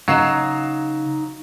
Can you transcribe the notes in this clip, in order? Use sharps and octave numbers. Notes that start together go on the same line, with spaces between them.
C#3 F#3 D#4 F5 F#5 A#5 C7 E7